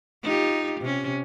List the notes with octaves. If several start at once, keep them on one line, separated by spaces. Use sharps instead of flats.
D#4 F4 G4
C3 C#4